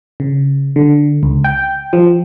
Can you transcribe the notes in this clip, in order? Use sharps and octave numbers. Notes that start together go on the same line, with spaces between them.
C#3
D3
C#2
G5
F3